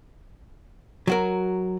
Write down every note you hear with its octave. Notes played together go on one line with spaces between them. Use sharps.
F#3 F#4 A#4